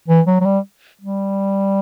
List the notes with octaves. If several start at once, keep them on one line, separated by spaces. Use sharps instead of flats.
E3
F#3
F#3
G3
G3